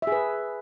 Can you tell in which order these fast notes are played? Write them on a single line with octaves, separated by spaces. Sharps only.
E5 G#4 B4